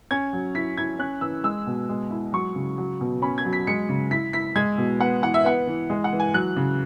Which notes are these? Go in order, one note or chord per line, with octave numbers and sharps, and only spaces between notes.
C#4 G#6
F#3
E4 B6
E4 G#6
C#4 F#6
E3 E6
G#3 E6
B2
G#3
E4
F#3 C#6
C#3
F#3
B2
C#4 B5
G#6
F#3
B6
G#3 C#7
C#3
E4 B6
E4 B6
G#3 G#6
B2
B3 F#5
E3 F#5
E5
B3 F#5
E3
G#3
F#5
E3
G#5
F#3 F#6
C#3